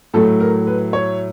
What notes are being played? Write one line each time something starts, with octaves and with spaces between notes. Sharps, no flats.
A2 F#3 A3 A4
A#4
B4
C#5